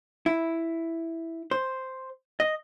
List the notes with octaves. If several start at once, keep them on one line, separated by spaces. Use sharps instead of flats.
E4
C5
D#5